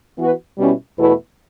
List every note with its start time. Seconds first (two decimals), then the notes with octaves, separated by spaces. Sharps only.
0.17 E3 B3 F#4 B4
0.57 B2 G3 C#4 E4
0.97 E2 B2 A3 E4 B4